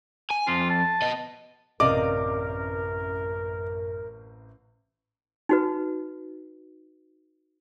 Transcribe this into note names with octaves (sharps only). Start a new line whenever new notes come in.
G#5
F2 F4
A5
B3 D#5
A1 F#2 C3 A#4 D5 D#5 F5 D6
D#4 F#4 B4